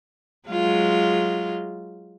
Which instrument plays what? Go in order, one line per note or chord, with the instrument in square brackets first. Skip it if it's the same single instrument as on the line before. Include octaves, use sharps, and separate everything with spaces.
[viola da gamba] F#3 G#3 F4